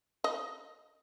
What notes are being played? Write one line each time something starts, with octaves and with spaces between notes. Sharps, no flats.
D#5